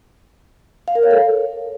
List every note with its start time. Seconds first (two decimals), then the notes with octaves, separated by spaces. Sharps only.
0.88 F5
0.95 A#4
1.03 C#5
1.11 A4